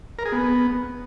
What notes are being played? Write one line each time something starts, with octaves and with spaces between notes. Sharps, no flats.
A#4
G#4
B3